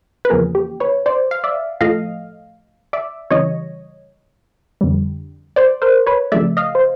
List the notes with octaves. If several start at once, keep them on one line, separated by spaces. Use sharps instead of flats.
B4
E2 C#3 F3 A#3 G#4 A#4
G4
B4 C#5
C5 D5
F5
D5 E5
A2 F3 A3 D#5 F5
D5 E5
C#3 E3 G3 C#5 D#5
F2 D3 G3
C5 D5
A#4 C5
B4 C#5
C#3 F3 A3 D5 E5
D#5 F5
C5